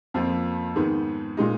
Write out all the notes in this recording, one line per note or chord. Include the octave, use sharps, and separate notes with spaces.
F2 F3 A#3
G#2 D#3 G#3 B3
A#2 G#3 D#4